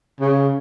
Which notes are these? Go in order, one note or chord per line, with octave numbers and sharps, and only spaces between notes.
C#3